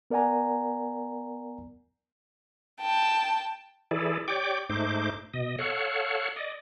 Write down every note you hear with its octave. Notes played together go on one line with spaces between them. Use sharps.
B3 A#4 D5 F#5 G#5 A#5
G5 A5
E3 E4 G#4 A4 D5
G4 C#5 D5 G5 D6
G#2 A3 D#4 C5 D6
B2 D#5
A4 C#5 F5 F#5
D5 D#5